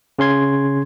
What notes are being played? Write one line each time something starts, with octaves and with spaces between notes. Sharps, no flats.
C#3 C#4 C6 G#6